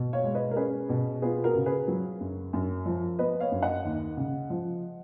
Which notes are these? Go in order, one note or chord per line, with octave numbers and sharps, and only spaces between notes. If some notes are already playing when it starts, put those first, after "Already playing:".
Already playing: B2
C#5 F5
G#3
B4 D#5
A#4
C#4 G#4 B4
B2
B3 F4 G#4
F#4 A#4
C#3
G#4 B4
F#3
F#2
F#2
F3
B3 B4 D#5
C#5 F5
F#2
D#5 F#5
D#2
C#3
F3